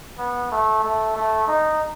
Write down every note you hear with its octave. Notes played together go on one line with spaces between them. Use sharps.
B3
A3
A3
A3
D#4